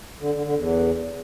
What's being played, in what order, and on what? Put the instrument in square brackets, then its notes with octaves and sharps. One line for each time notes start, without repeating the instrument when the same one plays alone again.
[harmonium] D3
D3
D3
E2